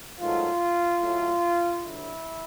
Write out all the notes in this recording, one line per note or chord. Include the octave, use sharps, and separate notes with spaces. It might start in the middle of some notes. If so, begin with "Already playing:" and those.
G#2 D#3 F#3 A3 F4
A2 F#3 A3
G2 D3 F#3 E4